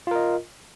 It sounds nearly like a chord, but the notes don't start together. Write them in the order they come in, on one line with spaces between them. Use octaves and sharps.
F4 A#4 D#5